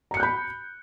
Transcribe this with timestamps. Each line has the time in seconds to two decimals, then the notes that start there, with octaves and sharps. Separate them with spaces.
0.11 A#5
0.14 C#7
0.17 F#6
0.20 G6
0.23 B5